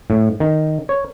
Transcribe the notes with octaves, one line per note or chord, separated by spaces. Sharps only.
A2
D#3
C#5